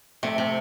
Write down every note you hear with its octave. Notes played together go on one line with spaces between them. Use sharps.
C3 A3
C3